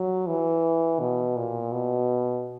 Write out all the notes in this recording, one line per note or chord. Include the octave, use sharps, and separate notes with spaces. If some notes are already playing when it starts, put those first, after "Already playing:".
Already playing: F#3
E3
B2
A#2
B2